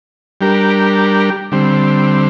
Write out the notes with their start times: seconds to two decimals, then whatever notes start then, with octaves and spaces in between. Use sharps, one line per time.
0.41 G3 D4 G4 A#4
1.52 D3 G3 C4